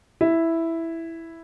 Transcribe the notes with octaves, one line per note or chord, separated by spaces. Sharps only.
E4